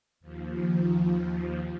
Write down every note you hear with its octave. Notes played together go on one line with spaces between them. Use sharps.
D#2 F3